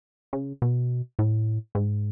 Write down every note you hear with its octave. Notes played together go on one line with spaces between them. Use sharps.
C#3
B2
A2
G#2